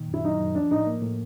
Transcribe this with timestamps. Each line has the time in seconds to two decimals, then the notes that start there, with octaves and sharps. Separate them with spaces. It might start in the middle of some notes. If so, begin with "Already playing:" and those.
Already playing: A#2 D#3
0.08 F#2
0.14 E4
0.24 F#3 D#4
0.40 F#2
0.55 F3 D4
0.71 A2 D#4
0.87 A#3
1.02 A2